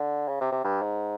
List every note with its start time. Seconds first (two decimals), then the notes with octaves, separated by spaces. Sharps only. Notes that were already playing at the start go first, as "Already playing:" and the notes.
Already playing: D3
0.28 C#3
0.41 C3
0.52 C3
0.65 G2
0.82 G#2